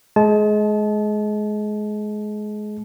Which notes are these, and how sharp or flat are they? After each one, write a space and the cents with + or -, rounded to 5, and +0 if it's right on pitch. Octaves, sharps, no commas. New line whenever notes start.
G#3 +25 A5 -30